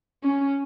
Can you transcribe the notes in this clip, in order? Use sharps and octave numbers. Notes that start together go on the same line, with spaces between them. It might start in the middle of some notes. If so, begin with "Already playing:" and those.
C#4